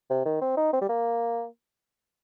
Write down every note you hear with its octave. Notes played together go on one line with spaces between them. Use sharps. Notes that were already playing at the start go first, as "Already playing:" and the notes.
C3
D#3
C4
D#4
C4
G3
A#3